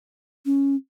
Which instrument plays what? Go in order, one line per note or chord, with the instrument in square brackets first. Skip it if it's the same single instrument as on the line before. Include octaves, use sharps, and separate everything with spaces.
[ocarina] C#4